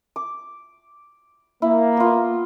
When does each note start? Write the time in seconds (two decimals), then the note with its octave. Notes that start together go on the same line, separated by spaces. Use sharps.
0.16 D6
1.62 A#3 E4
1.97 B3 F4